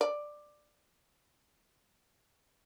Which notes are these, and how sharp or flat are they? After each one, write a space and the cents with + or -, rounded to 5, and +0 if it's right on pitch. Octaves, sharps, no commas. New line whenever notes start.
D5 +10